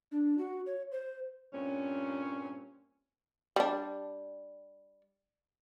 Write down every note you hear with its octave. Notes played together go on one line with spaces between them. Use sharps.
D4
F#4
C#5
C5
G2 A#2 C4 C#4
G3 D4